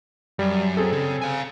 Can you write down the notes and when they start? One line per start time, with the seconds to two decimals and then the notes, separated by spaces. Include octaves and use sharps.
0.39 F#2 G3
0.77 C4 G#4 A4
0.92 C#3
1.22 F5 G#5